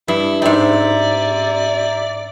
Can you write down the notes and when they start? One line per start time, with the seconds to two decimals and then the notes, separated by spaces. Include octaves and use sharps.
0.08 G2 E4
0.42 G#2 C4 D5 E5 A#5